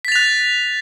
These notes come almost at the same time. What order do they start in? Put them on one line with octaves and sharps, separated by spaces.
B6 A6 F7 F#6